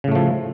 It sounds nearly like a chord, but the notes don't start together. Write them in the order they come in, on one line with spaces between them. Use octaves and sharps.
C#3 A2 A3 F3